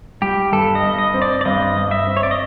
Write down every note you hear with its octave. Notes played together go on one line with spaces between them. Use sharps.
G3 G4
G2 A4
D#5
G2
D#5
C4
D5
D5
G2 D#5
G2
E5
C4
C#5
D5
D#5